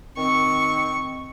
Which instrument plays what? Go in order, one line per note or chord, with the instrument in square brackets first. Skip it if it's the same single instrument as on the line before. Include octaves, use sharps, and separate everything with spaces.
[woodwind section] D#3 C4 [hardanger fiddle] C#6